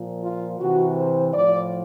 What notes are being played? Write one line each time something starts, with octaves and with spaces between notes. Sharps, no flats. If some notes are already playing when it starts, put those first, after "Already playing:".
Already playing: A#2 F3
F4
C3 E3 F#4
C5
A2 F3 D5